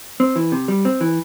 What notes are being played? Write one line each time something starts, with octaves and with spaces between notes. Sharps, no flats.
C4
E3
C3
G3
C4
E3